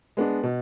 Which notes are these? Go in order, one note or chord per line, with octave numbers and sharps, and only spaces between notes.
G#3 B3 D4
B2